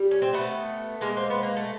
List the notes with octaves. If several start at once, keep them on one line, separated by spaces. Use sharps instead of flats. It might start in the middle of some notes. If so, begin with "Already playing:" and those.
Already playing: G3
C#4
C4
A3 B3
G#3 A#3
C4
B3
A#3
A3